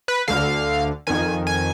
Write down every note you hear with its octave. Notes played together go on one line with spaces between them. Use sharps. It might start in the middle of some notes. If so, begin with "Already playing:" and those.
B4
D2 D3 F5
F2 D#3 G#5
G#5